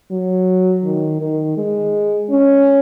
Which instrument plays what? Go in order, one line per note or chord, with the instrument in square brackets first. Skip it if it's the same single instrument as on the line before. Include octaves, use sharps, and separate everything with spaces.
[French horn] F#3
D#3
D#3
G#3
C#4